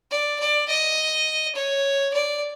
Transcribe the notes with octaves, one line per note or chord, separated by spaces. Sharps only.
D5
D5
D#5
C#5
D5